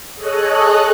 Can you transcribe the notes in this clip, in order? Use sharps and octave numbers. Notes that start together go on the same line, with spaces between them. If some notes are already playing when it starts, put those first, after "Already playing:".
G#4 A4 C#5 D#5 F#6